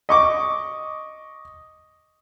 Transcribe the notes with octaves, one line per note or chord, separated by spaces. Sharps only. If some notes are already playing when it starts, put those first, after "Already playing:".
D#5 C#6 D6